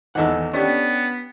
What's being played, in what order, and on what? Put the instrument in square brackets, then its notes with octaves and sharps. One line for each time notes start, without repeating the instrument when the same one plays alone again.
[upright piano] G#1 E2 [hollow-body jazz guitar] A4 D#5 F#5
[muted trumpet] B3 [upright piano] C#4 D4 G4